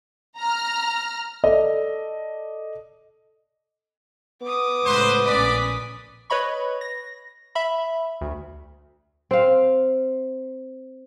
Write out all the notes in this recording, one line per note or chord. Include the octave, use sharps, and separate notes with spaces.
A#5 F6
A4 D5 D#5
B3 D6 D#6
C#2 A2 B4 C5
A#1 C#4 B4 D5 B6
B4 C#5 D#5 B5 C#6
A#6
E5 B5
D2
C4 F5